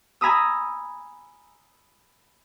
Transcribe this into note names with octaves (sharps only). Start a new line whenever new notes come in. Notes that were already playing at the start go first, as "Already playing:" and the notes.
G#5 A#5 B5 D#6 E6